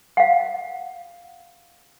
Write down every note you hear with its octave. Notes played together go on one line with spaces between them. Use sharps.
F5 F#5